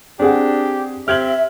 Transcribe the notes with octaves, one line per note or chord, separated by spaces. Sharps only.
C4 D4 G4 G#4 F#5
C4 G4 E5 F6 G#6 F#7